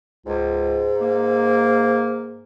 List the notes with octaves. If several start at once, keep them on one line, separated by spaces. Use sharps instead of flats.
C#2 G#2
A#3